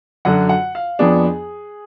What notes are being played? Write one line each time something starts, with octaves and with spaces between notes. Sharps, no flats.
F#2 D3 F#3 F#5
F#5
F5
F2 F3 B3 D4 G#4